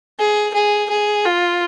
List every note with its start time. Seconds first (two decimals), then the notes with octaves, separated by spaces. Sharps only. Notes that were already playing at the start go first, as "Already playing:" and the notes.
0.19 G#4
0.54 G#4
0.90 G#4
1.25 F4